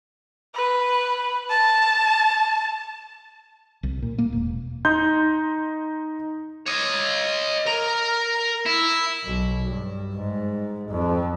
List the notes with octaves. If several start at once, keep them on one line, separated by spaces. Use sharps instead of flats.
B4
A5
C2
A#2
A#3
E1
D#4 C6 G6
C#5 D#5
A#4 A#5
E4
B1
G2
G#2
F2